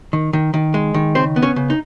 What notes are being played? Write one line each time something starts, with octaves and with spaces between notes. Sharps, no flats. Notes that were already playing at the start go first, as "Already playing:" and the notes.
D#3
D#3
D#3
G#3
D#3
C#3 C4 C5
B3
C#4 C#5
C#3
D#4